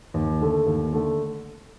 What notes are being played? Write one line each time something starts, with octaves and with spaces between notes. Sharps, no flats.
D#2
D3 A3
D#2
D3 A3